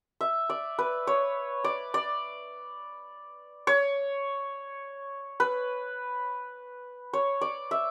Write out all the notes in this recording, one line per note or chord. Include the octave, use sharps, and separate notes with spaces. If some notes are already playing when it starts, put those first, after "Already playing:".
E5
D5
B4
C#5
D5
D5
C#5
B4
C#5
D5
E5